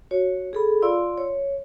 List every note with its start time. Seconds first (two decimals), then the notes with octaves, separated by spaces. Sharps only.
0.11 F#4 C#5
0.53 G#4 A4 B5
0.82 F4 D5 F5 C6 E6
1.18 C#5